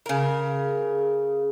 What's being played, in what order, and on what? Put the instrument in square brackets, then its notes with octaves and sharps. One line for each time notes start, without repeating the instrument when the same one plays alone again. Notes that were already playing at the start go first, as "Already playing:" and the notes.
[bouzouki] C#3 A#4